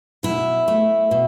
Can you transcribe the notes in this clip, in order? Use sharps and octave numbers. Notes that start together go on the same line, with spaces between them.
B2 E4
A3
B2